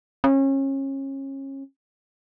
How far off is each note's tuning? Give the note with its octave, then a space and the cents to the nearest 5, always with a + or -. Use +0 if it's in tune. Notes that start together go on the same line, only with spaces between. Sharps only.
C#4 -30